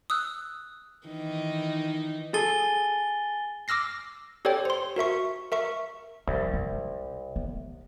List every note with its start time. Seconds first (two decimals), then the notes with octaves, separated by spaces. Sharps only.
0.10 D#6 E6 F#6
1.07 D#3 E3 D#4
2.34 G#4 A4 G#5 A6 G7
3.68 D6 E6 F6 A#6 C7
4.45 G4 A4 C#5 D5 G5
4.65 C5 C6
4.96 F#4 A#4 E5 C#6
5.52 A#4 E5 C#6
6.27 C2 F2
6.54 C3
7.36 B3